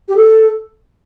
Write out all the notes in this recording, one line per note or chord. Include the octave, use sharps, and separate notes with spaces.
G4
A4